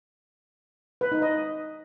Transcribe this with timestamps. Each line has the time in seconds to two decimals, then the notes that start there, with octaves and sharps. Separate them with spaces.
1.01 B4
1.12 D#4
1.22 D#5